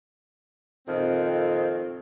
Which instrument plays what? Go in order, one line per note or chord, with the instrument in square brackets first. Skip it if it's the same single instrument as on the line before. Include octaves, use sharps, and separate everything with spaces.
[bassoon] F2 [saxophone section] A#2 D#3 C4